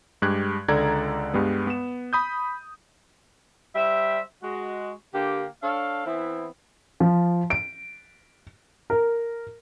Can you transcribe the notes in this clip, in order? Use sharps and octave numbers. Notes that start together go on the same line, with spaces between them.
G2 G#3 G4 F#6 G#6
C#2 D3 A4 D5 A#5 G#6
G2 G3 G#3 B3
B3 E7
B5 D#6 G6
G3 C5 E5
G#3 F#4
D3 A#3 G4
D4 A4 C#5 F5
E3 B3 C4 E4
F3
D7
A#4